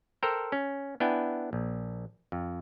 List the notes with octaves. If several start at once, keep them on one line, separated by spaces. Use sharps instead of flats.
A4 A#4 C5 G5 A#5
C#4
B3 D4 E4 G5 G#5
A#1
F2